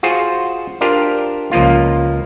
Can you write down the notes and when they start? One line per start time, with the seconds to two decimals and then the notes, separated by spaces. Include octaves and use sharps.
0.03 F4 F#4 G#4 C5
0.81 D4 F4 G4 A#4 C5
1.52 C#2 F3 A#3 F4